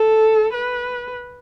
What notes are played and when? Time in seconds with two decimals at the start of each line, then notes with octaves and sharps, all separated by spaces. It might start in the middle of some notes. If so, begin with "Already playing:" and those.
Already playing: A4
0.53 B4